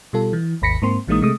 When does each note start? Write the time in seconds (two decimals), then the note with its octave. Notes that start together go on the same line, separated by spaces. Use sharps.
0.13 B2 G3 F4 A4
0.33 E3
0.62 G#1 D#2 B5 A#6 B6 C#7
0.82 G#2 A#3 C4 C6
1.07 A#1 E3 G#3 A#3 D#4 D#6
1.22 C3 G#3 A3 D#6